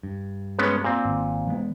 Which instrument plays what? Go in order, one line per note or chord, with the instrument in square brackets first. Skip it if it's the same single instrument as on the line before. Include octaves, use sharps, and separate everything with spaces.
[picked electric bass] G2
[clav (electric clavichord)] G#3 B3 C#4
A#2 C4
[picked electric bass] G#1
E3 G#3 B3